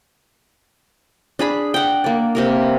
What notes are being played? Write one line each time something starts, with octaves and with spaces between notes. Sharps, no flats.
D4 G#4 B5
F#5 G5
A#3 D5
C3 A#3 A#4